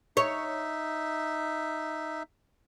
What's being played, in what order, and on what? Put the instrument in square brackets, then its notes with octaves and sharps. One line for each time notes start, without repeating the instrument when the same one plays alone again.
[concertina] D#4 E5 [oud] C#5